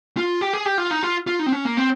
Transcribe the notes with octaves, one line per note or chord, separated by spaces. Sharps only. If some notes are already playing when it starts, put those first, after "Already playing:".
F4
G4
G#4
G4
F4
D#4
F4
F4
D#4
C4
C#4
A#3
C4